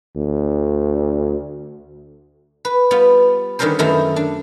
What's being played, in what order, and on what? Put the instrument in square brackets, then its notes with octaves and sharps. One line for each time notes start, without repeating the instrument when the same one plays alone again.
[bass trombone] D2
[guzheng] B4
G3 B3 F4
D3 D#3 G3 C#4 A#4 C5
F#2 D#3 A3 D#4 E4
D4